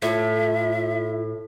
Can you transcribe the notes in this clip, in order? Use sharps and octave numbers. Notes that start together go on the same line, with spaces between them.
A2 F4 E5